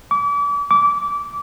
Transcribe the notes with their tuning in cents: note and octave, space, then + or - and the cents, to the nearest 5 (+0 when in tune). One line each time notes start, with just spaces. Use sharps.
D6 -40
D6 -25